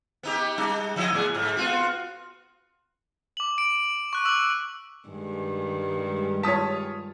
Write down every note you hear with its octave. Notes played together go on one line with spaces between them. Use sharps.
B3 D#4 G4
G3 D#4
F3 E4 D#5
A2 B3 G#4
G#2
B3 F4 F#4
D6 F#7
D7
C#6 F#6
D6 E6 F#7
G2 D#3 G#3
G3 G#3
F4 C#5 A5 D#6 B6